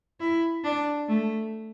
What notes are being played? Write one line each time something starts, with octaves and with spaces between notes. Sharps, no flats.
E4
D4
A3